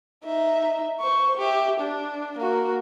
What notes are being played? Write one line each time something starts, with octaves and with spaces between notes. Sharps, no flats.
D#4 E5
C5 C#6
G4 E5
D4
A#3 F#4